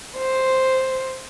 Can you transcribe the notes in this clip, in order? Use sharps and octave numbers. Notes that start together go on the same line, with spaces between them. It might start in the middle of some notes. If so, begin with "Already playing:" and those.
C5